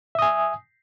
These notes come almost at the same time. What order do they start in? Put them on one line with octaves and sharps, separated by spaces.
E5 D#6 G#5